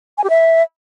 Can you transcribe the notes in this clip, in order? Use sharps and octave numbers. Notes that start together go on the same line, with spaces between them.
G#5
G4
E5